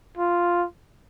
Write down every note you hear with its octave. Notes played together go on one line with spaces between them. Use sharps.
F4